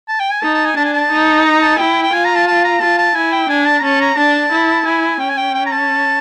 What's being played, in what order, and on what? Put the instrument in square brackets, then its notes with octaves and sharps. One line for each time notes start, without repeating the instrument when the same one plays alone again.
[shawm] A5
G5
G#5
[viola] D#4 [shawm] A5
[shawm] A5
G#5
[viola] D4 [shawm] A5
[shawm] G#5
A5
[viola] D#4
[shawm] A#5
A5
[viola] E4 [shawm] G5
[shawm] G5
[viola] F4 [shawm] G#5
[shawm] A#5
A5
A5
A#5
[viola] F4 [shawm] A5
[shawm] A5
[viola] E4 [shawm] G#5
[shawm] G5
[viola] D4 [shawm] G#5
[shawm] A5
A#5
[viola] C#4 [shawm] A5
[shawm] A#5
[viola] D4 [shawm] A5
[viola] E4
[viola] E4 [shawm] G#5
[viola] C#4 [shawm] G5
[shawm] G#5
G5
G5
A#5
A5